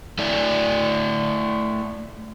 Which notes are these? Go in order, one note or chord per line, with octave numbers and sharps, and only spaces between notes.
A3 E4 D5